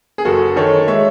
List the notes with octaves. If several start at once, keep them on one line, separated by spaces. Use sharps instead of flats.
G#4
F#1 F#4 A4
D#3 A4 C#5
G#3 C#5 E5